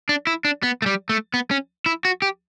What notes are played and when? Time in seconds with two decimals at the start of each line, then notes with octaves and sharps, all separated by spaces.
0.09 D4
0.27 E4
0.45 D4
0.63 B3
0.82 A3
0.86 G3
1.09 A3
1.34 B3
1.51 C#4
1.86 E4
2.05 F#4
2.22 G4